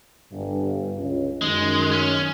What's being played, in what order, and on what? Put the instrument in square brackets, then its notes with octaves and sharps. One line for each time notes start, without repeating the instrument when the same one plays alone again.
[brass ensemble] G1 G2
C#2
[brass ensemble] F#2 D#3 [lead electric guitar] G#3
[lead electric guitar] C#4